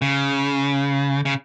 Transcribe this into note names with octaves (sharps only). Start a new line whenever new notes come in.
C#3
C#3